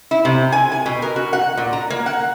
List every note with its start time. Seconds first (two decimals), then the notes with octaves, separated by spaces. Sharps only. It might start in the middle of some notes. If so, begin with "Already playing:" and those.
0.11 E4
0.25 C3
0.52 G#5
0.72 G#5
0.86 B2
1.02 A#4
1.16 F#4
1.33 F#5
1.58 A#2
1.73 A#5
1.90 A#3
2.06 F#5